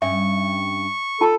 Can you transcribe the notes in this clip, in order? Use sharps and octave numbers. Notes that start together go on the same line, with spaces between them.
G2 C#4 E5 C#6
F4 A4 A5